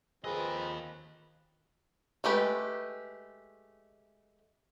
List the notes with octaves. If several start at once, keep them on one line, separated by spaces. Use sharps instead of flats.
D#2 F3 C4 F4 G#4 A#4 B4 D#5
G#3 A3 G4 B4